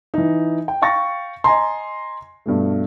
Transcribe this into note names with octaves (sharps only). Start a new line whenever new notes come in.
E3 D#4
G5
F5 G5 C#6 A6 A#6
D#5 G#5 A#5 C6
G2 B2 A3